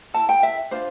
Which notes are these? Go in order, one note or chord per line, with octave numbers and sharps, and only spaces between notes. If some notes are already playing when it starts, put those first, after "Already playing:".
E4 A4 A5
G5
E5
D4 F4 C5